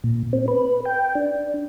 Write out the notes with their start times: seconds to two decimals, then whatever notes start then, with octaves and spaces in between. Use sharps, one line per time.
0.04 A#2
0.33 C4
0.48 B4
0.85 G5
1.15 D4